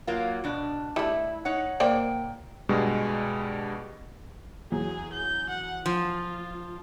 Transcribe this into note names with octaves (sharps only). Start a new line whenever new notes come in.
F#3 A#3 F4
B2 D4
G3 A3 E4
D#4 C#5 F#5
A#2 A#3 C5 D5 G5
G2 B2 G3 G#3
E2 F#3 G#4
G6
F#5
F3 F4